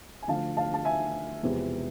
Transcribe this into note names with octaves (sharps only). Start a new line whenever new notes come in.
G#5
D2 D3 F3 F5 A5
F5 A5
A5
E5 G#5
E1 E2 C3 F3